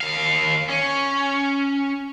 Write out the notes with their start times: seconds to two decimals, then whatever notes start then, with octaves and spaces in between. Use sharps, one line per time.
0.01 D#2 F5
0.70 C#4